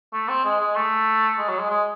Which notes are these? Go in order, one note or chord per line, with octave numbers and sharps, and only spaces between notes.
A3
C4
G#3
G#3
A3
G#3
F#3
G#3
G#3